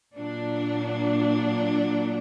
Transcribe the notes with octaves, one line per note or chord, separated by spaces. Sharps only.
A#2 F#3 D4